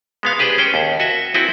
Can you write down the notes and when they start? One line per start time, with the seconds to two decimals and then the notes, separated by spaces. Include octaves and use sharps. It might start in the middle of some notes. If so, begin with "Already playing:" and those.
0.23 G#3 B3 F5
0.38 D4 G4 G#4 B4 C5 G5
0.58 C#4 C5 G5
0.74 D#2
1.00 F#4 D#5 E5
1.34 C4 E4 F#4 A4 G5 G#5